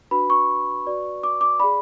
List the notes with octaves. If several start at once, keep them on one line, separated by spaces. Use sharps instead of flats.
D4 F#4 B4 B5
C#6
F#4 B4 D5
D6
D6
G#4 D5 B5